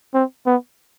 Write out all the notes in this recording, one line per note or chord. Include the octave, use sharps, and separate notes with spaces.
C4
B3